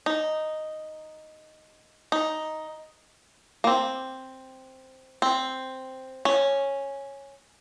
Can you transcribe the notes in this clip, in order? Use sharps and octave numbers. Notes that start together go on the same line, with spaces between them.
D#4
D#4
A#3
C4
C4
C#4